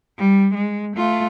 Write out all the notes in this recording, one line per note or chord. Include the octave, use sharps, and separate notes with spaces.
G3
G#3
A3 F4